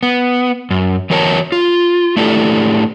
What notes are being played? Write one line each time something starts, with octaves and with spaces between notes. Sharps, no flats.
B3
F#2
E3 F#3 A#4 C#5 F#5 A5
F4
A3 D4 E4 G4 A4